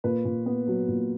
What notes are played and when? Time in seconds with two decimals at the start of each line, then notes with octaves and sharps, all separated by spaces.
0.04 A#2 B4
0.25 A#2
0.46 B3
0.68 F#3
0.88 A#2